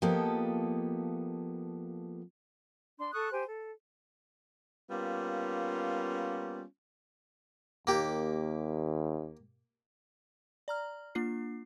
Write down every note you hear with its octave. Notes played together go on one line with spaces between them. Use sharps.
F3 A#3 B3 G4 A4 D#5
D4 C6
A4 C#6 D#6 F#6
G4 C5 G#5
A4
G3 A#3 B3 C#4 F4
D#2 A#3 G4
D5 A#5 F6
A#3 D4 F4 C7